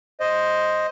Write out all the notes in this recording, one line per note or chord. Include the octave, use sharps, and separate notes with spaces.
C5 D#5